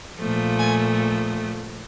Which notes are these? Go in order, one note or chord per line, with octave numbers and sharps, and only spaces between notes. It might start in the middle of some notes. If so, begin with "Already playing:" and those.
A#2 F3 A3
G#5